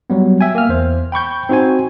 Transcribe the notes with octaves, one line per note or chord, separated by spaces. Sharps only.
F#3 G3 B3
E5 G5 G#5
A#3 F6
E2 C5
G5 B5 C#6 G6
C4 D#4 F#4 C5 G#5